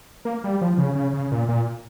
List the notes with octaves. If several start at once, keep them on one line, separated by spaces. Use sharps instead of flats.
A#3
G3
F3
C#3
C#3
C#3
A#2
A#2